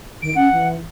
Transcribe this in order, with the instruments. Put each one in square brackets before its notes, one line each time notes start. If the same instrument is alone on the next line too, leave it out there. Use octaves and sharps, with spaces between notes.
[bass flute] D#3 [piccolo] D7
[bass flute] C#4 [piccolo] F#5
[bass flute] E3